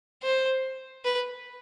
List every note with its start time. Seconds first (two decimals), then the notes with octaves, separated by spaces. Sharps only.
0.22 C5
1.05 B4